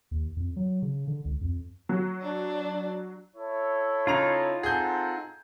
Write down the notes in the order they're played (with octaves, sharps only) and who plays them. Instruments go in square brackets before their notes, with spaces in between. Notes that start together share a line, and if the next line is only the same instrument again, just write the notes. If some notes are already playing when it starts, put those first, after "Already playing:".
[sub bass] D#2
F2
F#3
C#3
D3
C#2
F2
[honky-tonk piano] F#3
[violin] D4
[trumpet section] E4 A4 C#5
[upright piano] C#3 A#5 F7 [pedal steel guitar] D#4 F4
[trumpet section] C4 A4 F#5 [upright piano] G#4 G6